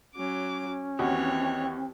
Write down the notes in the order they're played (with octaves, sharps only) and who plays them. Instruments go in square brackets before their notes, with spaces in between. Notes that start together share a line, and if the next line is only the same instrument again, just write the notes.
[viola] F#3 D6 [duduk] C#4
[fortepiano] D#2 F#4 [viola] E3 C#5 [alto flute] C4